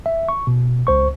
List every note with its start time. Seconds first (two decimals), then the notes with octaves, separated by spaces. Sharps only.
0.06 E5
0.29 C#6
0.47 B2
0.87 C#2 C5 C#6